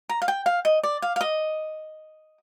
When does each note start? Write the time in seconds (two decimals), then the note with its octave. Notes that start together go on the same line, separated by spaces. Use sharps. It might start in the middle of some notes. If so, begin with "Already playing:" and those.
0.09 A#5
0.22 F5
0.28 G5
0.46 F5
0.65 D#5
0.83 D5
1.02 F5
1.16 F5
1.21 D#5